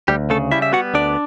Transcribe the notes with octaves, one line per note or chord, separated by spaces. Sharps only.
D2 G3 G4
C#3 A3 A4
G3 E4 E5
E5
B3 F#4 F#5
D2 D4 D5